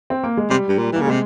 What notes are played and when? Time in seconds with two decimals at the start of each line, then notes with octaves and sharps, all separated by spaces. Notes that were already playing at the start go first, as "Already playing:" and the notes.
0.10 C4
0.23 A#3
0.37 G#3
0.50 C3 G3
0.69 G2
0.78 A#2
0.93 E3 A#3
1.01 C#3
1.07 C3 G#3